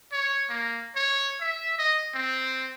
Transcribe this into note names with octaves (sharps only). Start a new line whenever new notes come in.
C#5
A#3
C#5
E5
D#5
C4